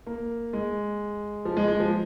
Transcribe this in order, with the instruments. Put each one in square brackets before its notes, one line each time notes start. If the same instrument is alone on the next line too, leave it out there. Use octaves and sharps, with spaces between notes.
[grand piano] A#3
G#3
F3
G#3
G#3
F3